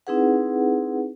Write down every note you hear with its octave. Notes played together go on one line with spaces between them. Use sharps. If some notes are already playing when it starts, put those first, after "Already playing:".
C4 D#4 E4 G#4 B4 F#5